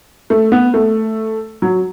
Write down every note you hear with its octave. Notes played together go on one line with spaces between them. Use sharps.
A3
B3
A3
F#3